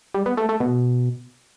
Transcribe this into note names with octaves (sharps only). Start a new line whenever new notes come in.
G3
B3
A3
A3
B2